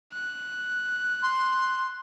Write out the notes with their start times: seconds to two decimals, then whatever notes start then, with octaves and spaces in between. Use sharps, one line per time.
0.13 F#6
1.22 C6